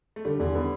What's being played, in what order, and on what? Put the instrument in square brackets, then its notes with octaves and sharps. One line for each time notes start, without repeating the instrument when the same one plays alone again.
[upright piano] A3
[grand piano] D3 [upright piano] G3
[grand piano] E2 [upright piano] D3
[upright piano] D3 [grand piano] B3